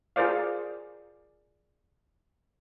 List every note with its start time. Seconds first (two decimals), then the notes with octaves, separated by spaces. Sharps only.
0.16 F4 G#4 A#4 C5 D5 F5